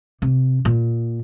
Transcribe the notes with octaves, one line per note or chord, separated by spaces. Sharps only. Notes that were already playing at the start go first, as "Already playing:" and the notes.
C3
A#2